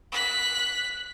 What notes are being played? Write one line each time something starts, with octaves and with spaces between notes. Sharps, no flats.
F#6 B6